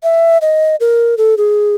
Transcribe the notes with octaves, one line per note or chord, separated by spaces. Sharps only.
E5
D#5
A#4
A4
G#4